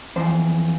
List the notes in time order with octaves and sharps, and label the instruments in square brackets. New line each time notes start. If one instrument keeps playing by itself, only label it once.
[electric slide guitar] F2 E3 C5